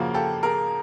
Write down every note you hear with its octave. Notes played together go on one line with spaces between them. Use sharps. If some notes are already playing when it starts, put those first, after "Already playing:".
Already playing: C#3 F3 A#3 F#4 G#4 A#4
G4 A4
G#4 A#4